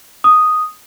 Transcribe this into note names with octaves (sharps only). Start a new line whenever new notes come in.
D#6